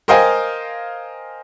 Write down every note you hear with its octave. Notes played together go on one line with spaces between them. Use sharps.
A#4 C5 D#5 F5 G5 G#5